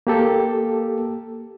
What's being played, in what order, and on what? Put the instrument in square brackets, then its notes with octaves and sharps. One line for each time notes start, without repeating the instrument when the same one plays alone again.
[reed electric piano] A#3 G4 A4